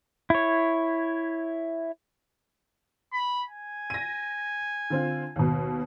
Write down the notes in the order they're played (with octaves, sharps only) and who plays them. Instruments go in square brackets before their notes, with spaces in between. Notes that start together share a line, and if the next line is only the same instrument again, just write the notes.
[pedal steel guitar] E4 C#5
[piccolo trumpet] B5
G#5
[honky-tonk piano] A#6 D#7
D3 C4 F4
D#2 B2